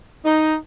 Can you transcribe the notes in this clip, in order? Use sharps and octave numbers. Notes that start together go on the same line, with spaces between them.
D#4